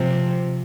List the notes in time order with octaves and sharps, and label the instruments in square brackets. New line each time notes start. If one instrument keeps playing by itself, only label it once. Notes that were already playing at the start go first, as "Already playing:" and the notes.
Already playing: [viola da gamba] C3 F3